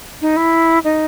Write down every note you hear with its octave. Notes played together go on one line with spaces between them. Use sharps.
D#4
E4
D#4